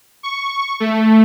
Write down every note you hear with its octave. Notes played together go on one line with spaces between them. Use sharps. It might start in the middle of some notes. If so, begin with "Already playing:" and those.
C#6
A3